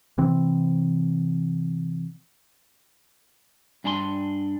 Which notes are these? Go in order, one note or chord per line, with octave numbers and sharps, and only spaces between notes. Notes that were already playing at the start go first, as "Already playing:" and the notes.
C3 E3 C4
G2 D4 G#5 A#5 C6